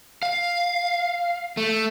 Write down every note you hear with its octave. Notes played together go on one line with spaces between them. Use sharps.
F5
A3